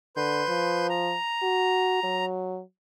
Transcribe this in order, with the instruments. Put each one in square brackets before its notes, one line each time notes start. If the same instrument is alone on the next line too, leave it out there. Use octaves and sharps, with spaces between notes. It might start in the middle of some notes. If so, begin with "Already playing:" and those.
[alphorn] D3 [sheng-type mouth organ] B4 C6 G6
[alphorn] F3
[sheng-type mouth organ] A#5
[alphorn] F#4
F#3